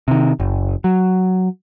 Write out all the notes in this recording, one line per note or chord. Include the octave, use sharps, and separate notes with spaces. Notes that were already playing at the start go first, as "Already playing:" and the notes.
C3 D#3
F#1
F#3